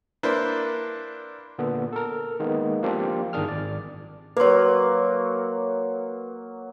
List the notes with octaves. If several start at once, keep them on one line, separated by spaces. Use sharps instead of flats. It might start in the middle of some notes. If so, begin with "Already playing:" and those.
A#3 D4 E4 B4 C5
A#2 D3 B3 A4
A4 A#4
D#3 G#3 A#3 B3
F3 A#3 C4 D4 F4 G4
G1 D#3 D4 G#4 F6
G#1 D5
F#3 A#3 B4 C6